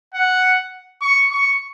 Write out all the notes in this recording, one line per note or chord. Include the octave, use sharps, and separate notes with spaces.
F#5
C#6
C#6